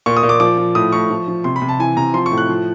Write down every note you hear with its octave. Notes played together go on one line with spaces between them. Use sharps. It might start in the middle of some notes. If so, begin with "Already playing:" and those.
A#2 C#6
D#6
A#2
D6
F3 D6
F3
A2 D#6
A2 C#6
F3
F3
C3 C6
B5
C3
A5
E3 G#5
C3 A#5
F3 C6
C#6
A2
F#6
F3